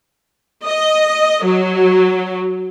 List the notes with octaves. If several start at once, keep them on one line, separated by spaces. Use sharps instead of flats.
D#5
F#3